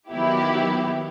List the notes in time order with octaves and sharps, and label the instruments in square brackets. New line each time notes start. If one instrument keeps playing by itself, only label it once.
[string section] D#3 F#3 B3 E4 G4